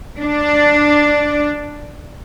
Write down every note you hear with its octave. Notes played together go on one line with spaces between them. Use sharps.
D4